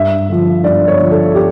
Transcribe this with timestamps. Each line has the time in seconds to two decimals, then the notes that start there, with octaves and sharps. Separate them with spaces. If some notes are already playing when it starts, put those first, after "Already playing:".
Already playing: G2 E5
0.29 D3 F3
0.64 G2 D5
0.88 C#5
1.00 D3 F3
1.12 A4
1.35 G4